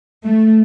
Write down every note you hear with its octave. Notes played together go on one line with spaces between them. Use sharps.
A3